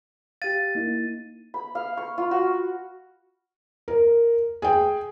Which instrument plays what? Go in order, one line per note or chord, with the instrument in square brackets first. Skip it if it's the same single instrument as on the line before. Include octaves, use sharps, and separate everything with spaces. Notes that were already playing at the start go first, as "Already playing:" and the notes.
[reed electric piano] G4 F5 [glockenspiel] A6 D#7
[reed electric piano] A#3 D#4 E4
[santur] B5
F5
C#6
F4
F#4
[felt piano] A#4
G#4 G5